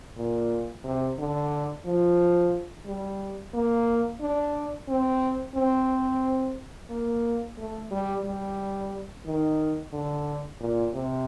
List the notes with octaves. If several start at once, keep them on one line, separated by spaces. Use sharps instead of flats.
A#2
C3
D3
F3
G3
A#3
D4
C4
C4
A#3
A3
G3
G3
D#3
D3
A#2
C3